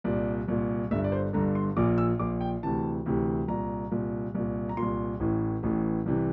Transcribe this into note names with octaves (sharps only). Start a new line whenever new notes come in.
C2 A#2 D5
C2 A#2
G1 G2 D3 E5
D5
C5
G1 G2 D3 A#5
C6
A#1 A#2 D6
E6
A#1 A#2 D6
G5
D2 C3 E3 A5
D2 C3 E3
C2 A#2 A#5
C2 A#2
C2 A#2
A#5
A#2 C6
C2
A1 A2 E3
A1 A2 E3
C2 C3 E3